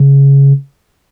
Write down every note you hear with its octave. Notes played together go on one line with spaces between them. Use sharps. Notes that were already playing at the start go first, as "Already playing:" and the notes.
Already playing: C#3